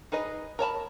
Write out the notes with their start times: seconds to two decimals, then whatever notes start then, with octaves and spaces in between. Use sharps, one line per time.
0.12 D#4 G#4 B4 D#5
0.59 A#4 C#5 A5 B5